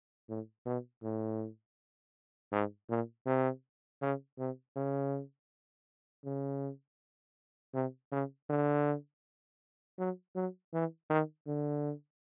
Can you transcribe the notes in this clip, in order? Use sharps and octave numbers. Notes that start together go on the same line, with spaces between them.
A2
B2
A2
G#2
A#2
C3
C#3
C3
C#3
C#3
C3
C#3
D3
F#3
F#3
E3
D#3
D3